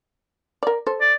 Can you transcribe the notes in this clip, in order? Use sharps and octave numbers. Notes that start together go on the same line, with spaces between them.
A#4 D5
A4 C5
D5